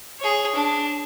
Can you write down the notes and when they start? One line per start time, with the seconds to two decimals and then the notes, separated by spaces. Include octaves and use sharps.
0.19 G#4 C#5
0.56 D4